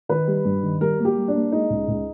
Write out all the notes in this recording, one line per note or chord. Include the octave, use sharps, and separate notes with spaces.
D#3 B4
G3
G2
D#3
G3 A#4
A#3
G4
G3
D4
A#3
G#3 D#4
C#2
C#2